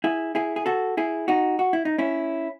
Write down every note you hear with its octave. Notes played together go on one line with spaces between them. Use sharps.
E4 G#4
E4 G#4
G#4
F#4 A4
E4 G#4
D#4 F#4
F#4
E4
D#4
C#4 E4